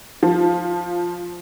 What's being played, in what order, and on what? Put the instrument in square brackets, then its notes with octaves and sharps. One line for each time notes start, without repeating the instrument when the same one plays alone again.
[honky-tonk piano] F3